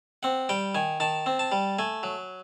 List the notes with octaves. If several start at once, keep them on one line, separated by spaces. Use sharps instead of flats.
C4 F#5
G3 G5
D#3 G#5
D#3 A5
C4
A5
G3
A3 G#5
F#3